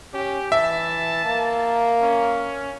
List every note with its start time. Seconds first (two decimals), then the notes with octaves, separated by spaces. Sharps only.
0.14 C#4 G4
0.52 E3 E5 A5
1.25 A#3
2.02 C#4